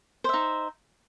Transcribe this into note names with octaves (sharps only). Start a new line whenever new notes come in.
D#4 C5 E5